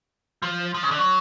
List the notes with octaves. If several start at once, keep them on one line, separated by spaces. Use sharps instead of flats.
F3
F3
C#3
D3
F#3